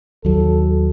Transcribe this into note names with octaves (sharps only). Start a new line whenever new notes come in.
D#2 F#3 A4